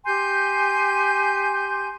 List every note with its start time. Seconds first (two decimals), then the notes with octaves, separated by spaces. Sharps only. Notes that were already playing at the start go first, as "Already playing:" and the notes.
0.05 G4 G#5 C6 G6